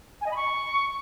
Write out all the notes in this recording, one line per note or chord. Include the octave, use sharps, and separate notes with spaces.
G#5
D#5
B5
C#6